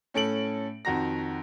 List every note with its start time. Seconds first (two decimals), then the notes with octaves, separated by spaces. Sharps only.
0.14 A2 C#4 A4 D7 F#7
0.85 F2 D#3 F#4 A#5 A#6